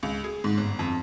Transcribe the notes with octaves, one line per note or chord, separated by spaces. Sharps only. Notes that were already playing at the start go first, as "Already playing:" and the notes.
C#2
G#4
G#2
G1
F2